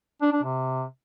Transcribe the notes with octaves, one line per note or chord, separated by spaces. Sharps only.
D4
D4
C3